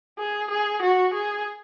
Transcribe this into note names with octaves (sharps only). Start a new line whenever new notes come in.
G#4
G#4
F#4
G#4